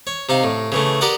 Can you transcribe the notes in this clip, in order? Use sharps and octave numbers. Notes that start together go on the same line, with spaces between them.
C#5
C3 D#4 F5
A2
C#3 E3 A3
G4 A#4 D5 F#5 D#6